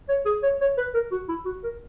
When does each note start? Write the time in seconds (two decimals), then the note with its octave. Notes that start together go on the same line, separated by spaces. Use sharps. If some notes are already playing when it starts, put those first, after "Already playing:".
0.09 C#5
0.26 G#4
0.43 C#5
0.61 C#5
0.78 B4
0.94 A#4
1.12 F#4
1.29 E4
1.45 F#4
1.64 A#4